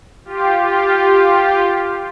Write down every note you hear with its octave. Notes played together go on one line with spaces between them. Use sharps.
F4 G4
F4 G4